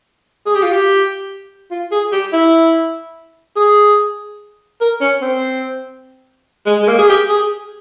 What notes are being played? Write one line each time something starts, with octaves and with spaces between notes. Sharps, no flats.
G#4
G4
F4
G4
F4
G#4
G4
E4
G#4
A#4
C#4
C4
G#3
G#3
A#3
G#4
G4
G#4